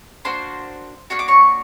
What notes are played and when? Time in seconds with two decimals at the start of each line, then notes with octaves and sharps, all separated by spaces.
0.25 A#3 D4 F#4 C5 C6
1.10 A#3 D4 F#4 C#6
1.19 D6
1.28 C#5 C#6